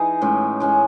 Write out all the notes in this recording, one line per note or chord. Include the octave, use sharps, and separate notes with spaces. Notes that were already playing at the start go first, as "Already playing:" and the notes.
Already playing: E3 D#4 G#4
A2 G#3 C#4
A2 G#3 C#4